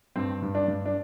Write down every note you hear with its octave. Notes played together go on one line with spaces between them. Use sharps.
G2 C4
G2
D4
G2
D4